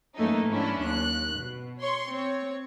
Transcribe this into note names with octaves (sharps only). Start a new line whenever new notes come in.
F#2 E3 A3 A#3 D#4
G#2 F#3 C#4 D4 E4
D#2 F#6
B2
C#5 C6 C#6
C4 C#5